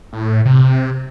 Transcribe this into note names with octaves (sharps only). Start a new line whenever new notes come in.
A2
C3